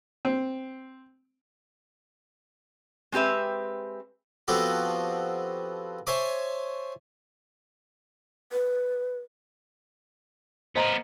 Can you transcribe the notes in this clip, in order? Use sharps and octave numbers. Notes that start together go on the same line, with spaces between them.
C4
G#3 C4 G4 B4 E5
F3 B3 C4 F#4 G4 A4
C5 C#5 E5 G#5 A5 D6
B4
B3 A#4 C5 D#5 A#5